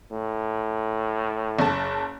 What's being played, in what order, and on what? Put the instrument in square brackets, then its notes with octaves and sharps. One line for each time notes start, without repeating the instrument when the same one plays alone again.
[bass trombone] A2
[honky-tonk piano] F#1 A5